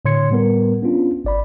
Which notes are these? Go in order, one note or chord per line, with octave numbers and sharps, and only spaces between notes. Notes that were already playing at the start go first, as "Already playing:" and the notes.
A2 D3 C#5 C6 G#6 C#7
A2 G3 B3 A#4
B3 C#4 D4 F4
G#1 D5 B5